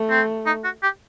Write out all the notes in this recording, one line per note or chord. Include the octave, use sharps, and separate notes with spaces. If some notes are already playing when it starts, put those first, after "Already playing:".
Already playing: A3
C4
D#4
F#4
G4